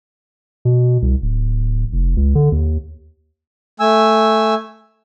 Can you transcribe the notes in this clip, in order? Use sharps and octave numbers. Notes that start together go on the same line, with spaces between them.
B2
C2
D1
F1
C#2
D3
D#2
A3 G#5 E6